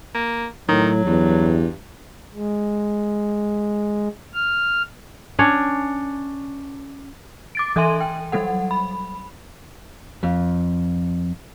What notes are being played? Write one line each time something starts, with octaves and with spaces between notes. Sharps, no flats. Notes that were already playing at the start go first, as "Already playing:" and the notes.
A#3
A2 D#3 F#3
E2 G2
G#3
F6
C#4 D4 C#5
D6 A6 D7
E3 A4 E5 G#5 C6 D#7
G5
F#3 G3 A4 F#5
B5
F2